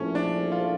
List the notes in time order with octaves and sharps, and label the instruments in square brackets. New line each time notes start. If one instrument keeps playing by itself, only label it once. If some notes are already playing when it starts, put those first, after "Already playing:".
Already playing: [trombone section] A#1 A2 F3 A3 [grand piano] C#4
[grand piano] D4
F4